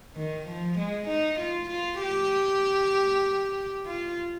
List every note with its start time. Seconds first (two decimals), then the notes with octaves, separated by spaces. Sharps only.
0.16 D#3
0.47 F3
0.78 G#3
1.08 D#4
1.39 F4
1.70 F4
2.01 G4
3.86 F4